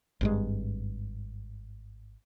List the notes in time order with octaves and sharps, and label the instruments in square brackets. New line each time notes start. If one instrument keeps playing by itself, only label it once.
[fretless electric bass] G#1 G2 G#3